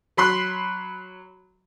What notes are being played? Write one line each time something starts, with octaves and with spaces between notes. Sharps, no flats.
F#3 B5 C6 F#6